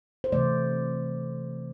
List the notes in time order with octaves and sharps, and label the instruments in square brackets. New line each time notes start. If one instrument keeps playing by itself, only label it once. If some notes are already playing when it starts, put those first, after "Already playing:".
[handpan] C5
C3 E3 A3 D5